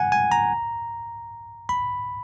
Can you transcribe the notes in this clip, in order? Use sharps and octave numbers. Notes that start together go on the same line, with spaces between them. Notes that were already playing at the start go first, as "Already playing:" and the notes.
Already playing: F#5 G#5
G#5
A#5
B5